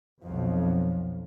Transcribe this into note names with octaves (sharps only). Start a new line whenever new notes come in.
B1 F2